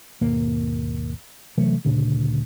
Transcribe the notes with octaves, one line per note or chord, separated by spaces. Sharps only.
G#1 D#2 B2 A#3
C3 E3 F#3 A3
D2 A#2 C#3 D4